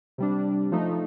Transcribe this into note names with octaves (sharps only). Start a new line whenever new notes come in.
C3 G3 D4
F3 A3 D#4